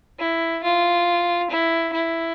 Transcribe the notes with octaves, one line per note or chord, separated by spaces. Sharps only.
E4
F4
E4
E4